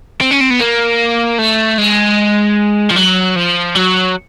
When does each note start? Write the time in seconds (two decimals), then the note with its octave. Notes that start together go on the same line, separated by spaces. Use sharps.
0.21 C4
0.31 C#4
0.41 C4
0.50 B3
0.60 A#3
1.38 A3
1.78 G#3
2.91 F3
2.96 F#3
3.36 F3
3.75 F#3